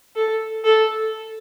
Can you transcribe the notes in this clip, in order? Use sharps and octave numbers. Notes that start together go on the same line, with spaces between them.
A4
A4